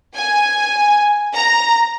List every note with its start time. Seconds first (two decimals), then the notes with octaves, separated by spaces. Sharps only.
0.15 G#5
1.34 A#5